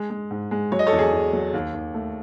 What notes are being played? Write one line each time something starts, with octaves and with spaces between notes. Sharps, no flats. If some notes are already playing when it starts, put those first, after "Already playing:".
Already playing: G#3
G#3
G#2
G#3
F#3 C#5
D#5
A4 C#5
E2
G#4
E2
F#3
D#2
D#2
A3